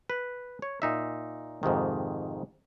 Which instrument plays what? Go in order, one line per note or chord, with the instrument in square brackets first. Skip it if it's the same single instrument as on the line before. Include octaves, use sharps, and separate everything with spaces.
[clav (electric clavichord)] B4
C#5
A#2 D#4 E5
F2 G#2 C3 D#3